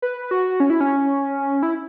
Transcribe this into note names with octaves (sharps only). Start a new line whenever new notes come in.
B4
F#4
C#4
E4
C#4
E4